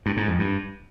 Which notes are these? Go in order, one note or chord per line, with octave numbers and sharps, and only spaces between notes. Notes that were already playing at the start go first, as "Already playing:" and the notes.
G2
G#2
F2
G2